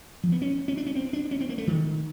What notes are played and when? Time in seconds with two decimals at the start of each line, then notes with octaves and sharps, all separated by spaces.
0.23 F3
0.32 B3
0.42 C#4
0.68 C#4
0.77 D4
0.86 C#4
0.95 C4
1.13 D4
1.31 C#4
1.41 C4
1.49 A#3
1.58 A3
1.67 D#3